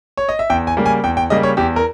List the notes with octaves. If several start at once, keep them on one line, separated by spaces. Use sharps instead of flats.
C#5
D#5
E5
E2 G5
G#5
C#3 G3 A#3
G#5
E2 G5
G5
C#3 G3 A#3 D#5
C#5
E2 G4
A#4